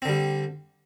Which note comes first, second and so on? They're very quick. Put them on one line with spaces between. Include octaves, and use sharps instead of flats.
C4 D3 G3